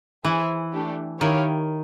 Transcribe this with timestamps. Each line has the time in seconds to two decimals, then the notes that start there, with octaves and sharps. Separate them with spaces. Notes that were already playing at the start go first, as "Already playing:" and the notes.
0.24 E3 G#4 C5 E5 G#5
0.72 A3 D4 G4
1.20 D#3 E4 G4 A#4 C#5 F5